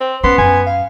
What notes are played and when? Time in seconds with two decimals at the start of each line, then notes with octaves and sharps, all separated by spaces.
0.01 C4
0.24 B3 C#4 C6
0.38 F#2 G#5
0.67 F5